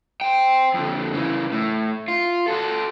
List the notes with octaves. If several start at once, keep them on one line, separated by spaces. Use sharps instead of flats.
C5 G5
F2 D3
C#3 E3
A2
F4
F#4 A4